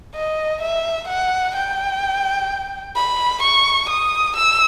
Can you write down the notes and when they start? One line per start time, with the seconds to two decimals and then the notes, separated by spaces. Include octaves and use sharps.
0.15 D#5
0.62 E5
1.08 F#5
1.55 G5
2.96 B5
3.43 C#6
3.89 D#6
4.36 E6